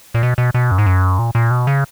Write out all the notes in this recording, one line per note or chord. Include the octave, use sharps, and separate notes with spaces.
A#2
B2
B2
B2
F#2
G#2
F#2
A#2
A#2
B2
C#3